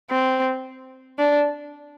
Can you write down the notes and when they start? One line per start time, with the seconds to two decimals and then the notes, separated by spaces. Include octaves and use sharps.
0.11 C4
1.19 D4